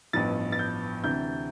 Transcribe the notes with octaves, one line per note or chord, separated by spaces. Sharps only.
A1 G2 F3 B3 A6
A6
G6
D2 C3 E3 G6